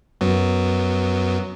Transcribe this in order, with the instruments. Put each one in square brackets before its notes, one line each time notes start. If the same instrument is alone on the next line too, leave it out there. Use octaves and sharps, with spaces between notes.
[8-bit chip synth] F#2 F#3 B3